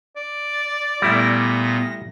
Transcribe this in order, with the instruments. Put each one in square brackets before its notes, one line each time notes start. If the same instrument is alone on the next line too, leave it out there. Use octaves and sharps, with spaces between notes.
[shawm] D5
[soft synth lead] A6
[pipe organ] A#2 B3 [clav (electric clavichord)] G3 A3 E4 [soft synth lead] A#6